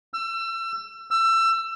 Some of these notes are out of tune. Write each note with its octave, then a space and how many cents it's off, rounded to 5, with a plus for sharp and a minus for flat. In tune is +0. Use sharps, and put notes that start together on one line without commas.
E6 +35
E6 +25